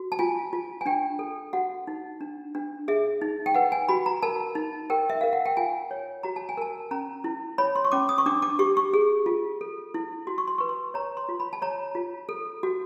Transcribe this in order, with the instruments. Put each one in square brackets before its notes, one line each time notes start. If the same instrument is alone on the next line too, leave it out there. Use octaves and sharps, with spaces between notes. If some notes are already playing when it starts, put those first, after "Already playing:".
Already playing: [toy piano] F#4
A5
F4 G#5
F4
G#5
D4 G5
A4
F#4 F#5
D#4
D4
D4
G#4 E5
D#4
G5
B4 F#5
G#5
F#4 B5
A#5
A#4 A5
D#4
A#4 G5
E5
A#4 F5
F#5
G5
F4 G#5
C#5
F#4 A#5
A5
G#5
A#4 A5
C#4 A#5
E4
C#5 B5
C6
C#6
C#4 D6
D#6
C#6
D4 D6
D6
G4 C#6
C#6
G#4
F4
A4
E4
F#4 C6
C#6
C6
B4 C#6
C6
C#5 A#5
C6
F4
B5
A5
C#5 A#5
F4
A4
F#4